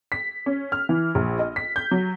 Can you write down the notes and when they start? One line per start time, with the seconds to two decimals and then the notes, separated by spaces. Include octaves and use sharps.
0.12 B6
0.46 C#4
0.72 F6
0.89 E3
1.15 A#1
1.39 D#5
1.56 B6
1.76 G6
1.91 F#3